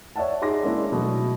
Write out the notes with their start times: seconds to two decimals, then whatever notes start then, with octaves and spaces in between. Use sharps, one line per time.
0.16 C#5 D5 E5 F#5 A5
0.42 D#4 G#4 C6 D6 A#6
0.63 G#3 A#3 C#4 D4 E4
0.92 B2 F#3 A3